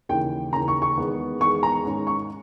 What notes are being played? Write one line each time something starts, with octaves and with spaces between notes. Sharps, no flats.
D#2 C#3 E3 G5
D#2 C#3 E3 A#5
C#6
C#6
E2 D#3 G#3 B3
E2 D#3 G#3 B3 C#6
A#5
G#2 D#3 G#3 C#4
C#6